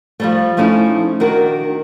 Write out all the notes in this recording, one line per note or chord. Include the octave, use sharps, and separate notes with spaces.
F3 G3 A3
F3 A3 C#4 D#4 E4
D#3 D4 F#4 A#4